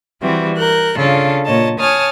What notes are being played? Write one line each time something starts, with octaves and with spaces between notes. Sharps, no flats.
E3 G3 C4 F#4
A#4 F#6 G6
C#3 D4 F4 A4
A#2 C#5 D#5 A5
C#5 G#5 A5 D#6 F6